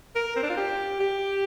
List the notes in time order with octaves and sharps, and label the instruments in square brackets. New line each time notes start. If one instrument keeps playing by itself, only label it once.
[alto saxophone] A#4
C4
D4
F4
G4
G4